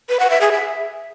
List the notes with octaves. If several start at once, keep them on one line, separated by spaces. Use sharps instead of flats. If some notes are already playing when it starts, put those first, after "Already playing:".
B4
F#5
E5
G#4
E5